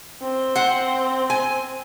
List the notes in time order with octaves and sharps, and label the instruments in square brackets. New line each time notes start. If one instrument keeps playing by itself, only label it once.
[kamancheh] C4
[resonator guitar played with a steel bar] C5 F#5
G#5